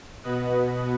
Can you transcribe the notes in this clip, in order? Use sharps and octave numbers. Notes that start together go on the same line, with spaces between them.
B2 B3 F#4 B4 D#5